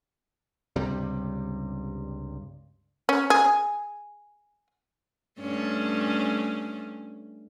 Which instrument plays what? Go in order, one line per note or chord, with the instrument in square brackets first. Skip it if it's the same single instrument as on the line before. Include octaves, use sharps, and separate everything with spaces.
[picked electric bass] C#2 G2 C3 G3
[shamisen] C#4
G#4
[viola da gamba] G2 A3 C#4